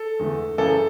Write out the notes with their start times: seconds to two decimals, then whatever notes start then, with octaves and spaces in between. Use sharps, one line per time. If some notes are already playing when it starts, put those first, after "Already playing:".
Already playing: A4
0.19 E2 D3 A3
0.58 F#2 C#3 E3 A4